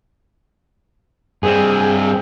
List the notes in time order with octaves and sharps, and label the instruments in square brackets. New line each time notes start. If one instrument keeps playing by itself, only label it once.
[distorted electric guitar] G2 C4 [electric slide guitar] G#4